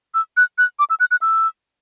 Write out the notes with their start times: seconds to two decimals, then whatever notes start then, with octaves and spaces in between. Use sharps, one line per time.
0.14 E6
0.37 F#6
0.58 F#6
0.79 D6
0.90 E6
1.00 F#6
1.11 F#6
1.21 E6